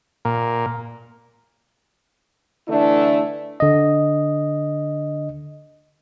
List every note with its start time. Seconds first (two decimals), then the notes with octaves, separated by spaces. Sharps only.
0.25 A#2
2.67 D3 E3 A3 D4 E4
3.60 D3 D#5